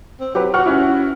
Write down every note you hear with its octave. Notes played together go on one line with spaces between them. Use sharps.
C4
F#3 G4 B4
F#4 F#5 C#6 F6
C#4 E4